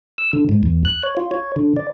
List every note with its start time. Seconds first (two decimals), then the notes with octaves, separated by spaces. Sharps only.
0.18 E6
0.33 D3
0.49 G#2
0.63 E2
0.85 F#6
1.03 C#5
1.17 F4
1.31 C#5
1.56 D3
1.77 D5